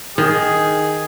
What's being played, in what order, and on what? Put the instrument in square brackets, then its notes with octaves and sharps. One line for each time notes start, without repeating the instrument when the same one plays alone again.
[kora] D#3 [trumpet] G#4